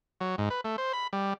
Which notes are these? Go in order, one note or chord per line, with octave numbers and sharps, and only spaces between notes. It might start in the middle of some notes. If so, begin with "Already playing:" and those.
F#3
G#2
B4
A3
C5
B5
G3